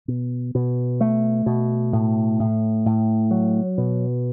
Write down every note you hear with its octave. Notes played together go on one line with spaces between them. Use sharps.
B2
B2
A3
B2
A2
A2
A2
F#3
B2